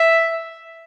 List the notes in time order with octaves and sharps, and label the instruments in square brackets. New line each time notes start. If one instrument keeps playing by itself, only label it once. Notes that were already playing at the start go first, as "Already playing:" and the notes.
Already playing: [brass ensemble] E5